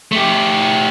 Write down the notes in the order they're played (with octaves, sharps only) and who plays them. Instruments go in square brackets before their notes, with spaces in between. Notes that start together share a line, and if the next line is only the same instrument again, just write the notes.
[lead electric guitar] A3 G4